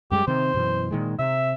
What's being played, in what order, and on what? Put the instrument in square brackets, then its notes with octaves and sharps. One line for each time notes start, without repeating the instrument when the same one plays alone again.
[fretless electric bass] F#2 G3 G#3 [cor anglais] G4
[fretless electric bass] C3 D#3 C4 [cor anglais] C5
[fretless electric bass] F#2 B2 E3
A#2 D#3 G#3
[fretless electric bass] C3 [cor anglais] E5